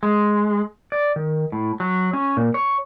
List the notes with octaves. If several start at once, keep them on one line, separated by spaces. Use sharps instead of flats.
G#3
D5
D#3
A2
F#3
C#4
A#2
C#5